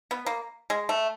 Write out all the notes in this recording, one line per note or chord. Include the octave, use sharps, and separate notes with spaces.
B3
A#3
G#3
A3